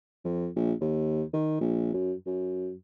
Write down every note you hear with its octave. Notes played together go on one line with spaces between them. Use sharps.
F2
A#1
D#2
D#3
A#1
F#2
F#2